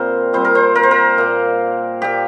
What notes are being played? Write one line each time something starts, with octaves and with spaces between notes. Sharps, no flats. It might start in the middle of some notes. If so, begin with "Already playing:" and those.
Already playing: A#2 G3 C4 A#4 C5
A#2 G3 C4 C5
A#4
C5
A#4
C5
A#4
A#2 A#3
A#2 A#3 G4